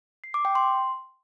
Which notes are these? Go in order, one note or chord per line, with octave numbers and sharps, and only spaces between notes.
C7
D6
G5
C6